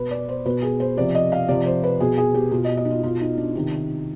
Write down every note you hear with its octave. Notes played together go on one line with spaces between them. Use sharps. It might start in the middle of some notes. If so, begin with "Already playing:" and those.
Already playing: B2 B4
D5
C5
B2 B4
G#4
C5
C3 F3 D5
D#5
F5
C3 F3 D5
C5
B4
B2 G#4
G#4
G4
B2 F4
D#5
D#5
D#4
F4
B2 F4
D#4
D4
C3 D#3 D#4